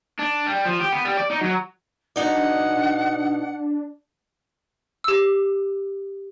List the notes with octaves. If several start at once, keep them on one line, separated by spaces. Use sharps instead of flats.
D4
G3
F3
G4
B3
G3
D5
D#4
F#3
B2 D4 D#4 D5 F#5
G4 E6